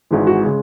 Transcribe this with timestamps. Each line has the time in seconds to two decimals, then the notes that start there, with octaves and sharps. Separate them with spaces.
0.11 G#1 G#2 E3 G#3
0.27 F#4
0.44 C#3 G#3